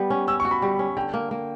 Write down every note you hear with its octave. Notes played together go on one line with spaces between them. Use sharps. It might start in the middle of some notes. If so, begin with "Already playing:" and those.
Already playing: G3 B3
C#4
C#4 E6
C#6
F#4
B5
G3
C#4
D3 G5
A#3
A#3